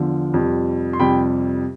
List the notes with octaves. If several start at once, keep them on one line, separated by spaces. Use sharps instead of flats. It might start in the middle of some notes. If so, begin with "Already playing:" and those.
Already playing: E2 D3 F3
F2 C3 G3
C6
F2 C3 G3 G5 B5